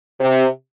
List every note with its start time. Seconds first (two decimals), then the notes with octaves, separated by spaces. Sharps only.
0.20 C3